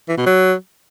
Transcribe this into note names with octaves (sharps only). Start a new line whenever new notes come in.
E3
B2
F#3